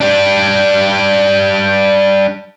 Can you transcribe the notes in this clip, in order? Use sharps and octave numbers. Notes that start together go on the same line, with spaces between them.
G3 D4